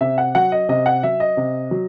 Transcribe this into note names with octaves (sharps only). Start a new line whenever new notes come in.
C3 E5
F#5
F#3 F#5
D#5
C3 D#5
F#5
F#3 E5
D#5
C3
F#3